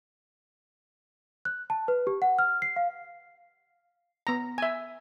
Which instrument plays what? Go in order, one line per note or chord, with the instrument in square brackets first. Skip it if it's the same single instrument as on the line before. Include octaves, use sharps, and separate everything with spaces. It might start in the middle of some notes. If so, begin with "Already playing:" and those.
[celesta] F#6
A5
B4
G4
F#5
F6
C7
F5
[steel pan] B3 A#5
E5 G#5